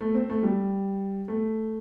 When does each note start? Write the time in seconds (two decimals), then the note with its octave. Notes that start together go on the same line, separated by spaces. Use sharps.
0.01 A3
0.14 C4
0.30 A3
0.43 G3
1.28 A3